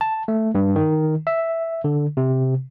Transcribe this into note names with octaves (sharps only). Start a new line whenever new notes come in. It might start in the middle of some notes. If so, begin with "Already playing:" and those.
A5
A3
G2
D#3
E5
D3
C3